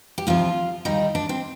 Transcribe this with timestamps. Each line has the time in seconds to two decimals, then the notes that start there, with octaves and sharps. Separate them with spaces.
0.18 G4
0.27 D2 C3 F3 F4
0.85 D#2 D#3 G3 D#4
1.15 D4
1.29 C4